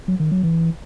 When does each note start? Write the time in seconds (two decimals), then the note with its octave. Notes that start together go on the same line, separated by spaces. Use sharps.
0.08 F#3
0.20 D#3
0.31 F#3
0.43 E3